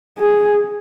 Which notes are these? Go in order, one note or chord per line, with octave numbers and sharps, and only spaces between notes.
G#4